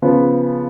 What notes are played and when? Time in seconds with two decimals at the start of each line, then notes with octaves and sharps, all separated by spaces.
0.02 C#3 F3 B3